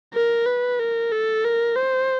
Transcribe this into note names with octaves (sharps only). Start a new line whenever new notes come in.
A#4
B4
A#4
A4
A#4
C5